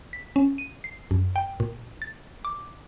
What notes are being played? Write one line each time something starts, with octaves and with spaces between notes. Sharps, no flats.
B6
C#4
D#7
C7
F#2
G5
A#2
A6
D6